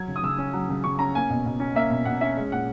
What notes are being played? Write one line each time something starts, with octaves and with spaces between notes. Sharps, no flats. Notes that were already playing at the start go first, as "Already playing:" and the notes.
Already playing: F#3 G#6
C#3
D#6
C#3 E6
C#4
F#3
C#3
C#3 C#6
C#4 A#5
A#3 G#5
B2
B2
C#4
A#3 E5
B2
B2 F#5
C#4 E5
G#3
A#2 F#5